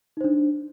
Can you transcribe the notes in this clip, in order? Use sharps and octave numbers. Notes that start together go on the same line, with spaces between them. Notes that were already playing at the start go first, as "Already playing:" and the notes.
D4 D#4 C5